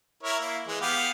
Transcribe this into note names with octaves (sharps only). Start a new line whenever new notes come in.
E4 A#4 C#5
A#3 E4
E3 G#3
B3 G4 F5